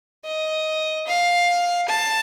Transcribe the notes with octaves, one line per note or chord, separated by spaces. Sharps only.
D#5
F5
A5